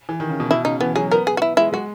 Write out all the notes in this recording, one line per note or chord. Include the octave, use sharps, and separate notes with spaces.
E3
D#3
C#3
B2
B2 E4
C#3 D#4
E3 B3
F#3 G#4
B3 A#4
G#4
F#4
E4
G#3 E4
G#3 F#4